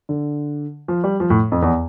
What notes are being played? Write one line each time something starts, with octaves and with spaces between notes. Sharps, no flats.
D3
F3
G3
F3
A2
F2
E2